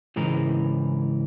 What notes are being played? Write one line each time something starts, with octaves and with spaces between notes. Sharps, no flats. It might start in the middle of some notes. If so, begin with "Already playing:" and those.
C#2 G#2 E3 A#4